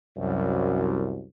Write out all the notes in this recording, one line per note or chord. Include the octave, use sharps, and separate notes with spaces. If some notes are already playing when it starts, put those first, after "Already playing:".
C2 F#2